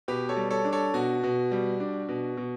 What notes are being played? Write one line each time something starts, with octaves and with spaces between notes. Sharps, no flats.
B2 G4 B4
A4 C#5
G3
A4 C#5
D4
A4 C#5
B2 F#4
B2
G3
D4
B2
B2